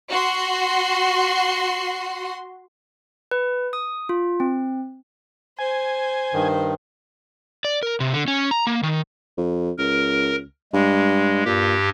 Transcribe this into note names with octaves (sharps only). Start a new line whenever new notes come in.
F#4 C6
B4
D#6
F4
C4
C5 G#5
G2 D#3
D5
A#4
C3
D3
C#4
A#5
A#3
D#3
F2
C#2 A#4
G2 G#3
G2 A#2 G4